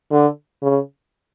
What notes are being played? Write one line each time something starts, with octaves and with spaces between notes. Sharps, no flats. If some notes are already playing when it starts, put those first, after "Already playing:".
D3
C#3